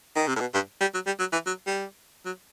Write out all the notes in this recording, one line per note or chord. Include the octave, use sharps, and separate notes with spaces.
D#3
C3
A2
B2
G2
G3
F#3
G3
F#3
E3
F#3
G3
F#3